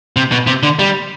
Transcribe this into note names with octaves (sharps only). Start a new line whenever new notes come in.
C3
B2
C3
D3
G3